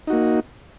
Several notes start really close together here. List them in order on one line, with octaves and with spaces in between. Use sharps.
D#4 F#4 A#3